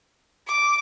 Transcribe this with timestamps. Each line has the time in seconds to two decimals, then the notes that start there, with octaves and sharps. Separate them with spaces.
0.48 D6